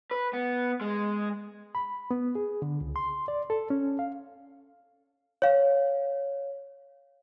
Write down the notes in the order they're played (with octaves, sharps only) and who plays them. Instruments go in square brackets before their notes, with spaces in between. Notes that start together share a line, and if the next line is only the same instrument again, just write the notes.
[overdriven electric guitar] B4
B3
G#3
[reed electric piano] B5
B3
G#4
D3
C#2
C6
D5
A4
C#4
F5
[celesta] C#5 F5